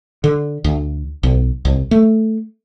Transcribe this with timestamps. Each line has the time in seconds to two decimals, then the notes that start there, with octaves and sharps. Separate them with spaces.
0.24 D3
0.64 D2
1.23 B1
1.65 C2
1.91 A3